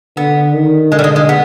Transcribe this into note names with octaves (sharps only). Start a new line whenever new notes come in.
D3 B3
D#3
D3 G#3
G3
G#3
G#3
B3